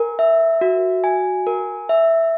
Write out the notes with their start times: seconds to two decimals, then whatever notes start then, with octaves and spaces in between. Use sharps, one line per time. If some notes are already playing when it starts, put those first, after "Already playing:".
Already playing: A#4 G#5
0.19 E5
0.61 F#4
1.04 G#5
1.47 A#4
1.89 E5